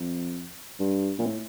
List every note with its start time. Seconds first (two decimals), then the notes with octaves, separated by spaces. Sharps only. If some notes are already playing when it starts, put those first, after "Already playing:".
Already playing: F2
0.80 G2
1.19 A#2
1.26 A2